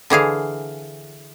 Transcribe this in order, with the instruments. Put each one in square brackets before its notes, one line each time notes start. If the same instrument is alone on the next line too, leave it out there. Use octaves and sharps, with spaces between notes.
[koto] D3 E3 G#4 F5